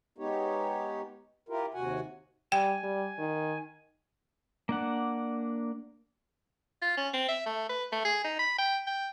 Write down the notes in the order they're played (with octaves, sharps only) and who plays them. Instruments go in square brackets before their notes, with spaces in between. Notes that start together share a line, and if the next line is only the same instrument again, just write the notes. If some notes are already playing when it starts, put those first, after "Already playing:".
[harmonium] G#3 B3 D#4 G4 C#5
E4 F4 G4 A#4
D#2 C3 F#4 F#5 G#5
[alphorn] G3 [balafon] G5 [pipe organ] G#5
[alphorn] G3
D#3
[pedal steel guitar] A#3 D4 F#5
[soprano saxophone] F4
C#4
C4
E5
A3
B4
A3
G#4
D#4
B5
G5
G5